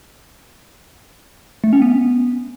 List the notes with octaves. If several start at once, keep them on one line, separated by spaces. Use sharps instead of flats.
A3
C#4
B3